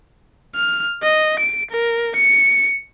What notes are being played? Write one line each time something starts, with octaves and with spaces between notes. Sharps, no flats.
F6
D#5
D7
A#4
C#7